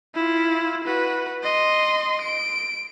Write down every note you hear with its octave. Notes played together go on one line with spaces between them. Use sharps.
E4 F4
F#4 B4
D#5 C6
D7